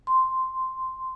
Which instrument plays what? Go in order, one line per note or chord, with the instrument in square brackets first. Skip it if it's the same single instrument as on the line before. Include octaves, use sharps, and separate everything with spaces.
[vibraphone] C6